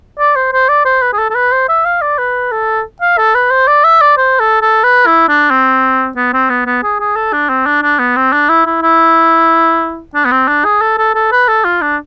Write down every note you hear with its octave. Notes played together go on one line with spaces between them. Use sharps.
D5
C5
C5
D5
C5
B4
G#4
A4
A4
B4
C5
E5
F5
D5
B4
A4
F5
A4
B4
C5
D5
E5
D5
C5
A4
A4
B4
E4
D4
C4
B3
C4
B3
B3
G#4
G#4
A4
D4
C4
D4
D4
B3
C4
D4
E4
E4
E4
D4
B3
C4
D4
G#4
A4
A4
A4
B4
A4
F4
D4